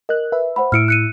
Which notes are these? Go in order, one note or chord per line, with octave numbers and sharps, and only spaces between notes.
A#4 D#5 F#6
B4 E5
C5 F#5 B5
A2 E4 E6 F6 C#7 D7
F#6 C#7 D#7